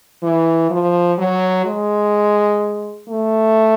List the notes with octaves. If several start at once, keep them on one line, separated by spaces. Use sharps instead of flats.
E3
F3
F#3
G#3
A3